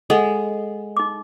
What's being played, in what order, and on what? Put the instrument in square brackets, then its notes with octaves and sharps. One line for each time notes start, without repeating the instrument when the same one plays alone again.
[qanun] G#3 [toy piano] A4 D#5 F#5
[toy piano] D#4 D6